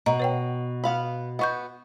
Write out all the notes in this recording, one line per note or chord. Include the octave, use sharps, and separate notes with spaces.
B2 D#5 A#5
B4 C#5 G5
B3 F5 B5
B3 F#4 D#5 C#6 G6